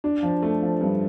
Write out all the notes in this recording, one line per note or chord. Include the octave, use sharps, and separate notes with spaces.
D4
F3
A3
F3
G2